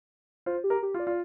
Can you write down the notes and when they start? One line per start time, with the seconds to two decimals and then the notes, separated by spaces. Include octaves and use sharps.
0.46 F4 C5
0.64 G4
0.70 A#4
0.83 G4
0.94 F4
1.00 D5
1.07 F4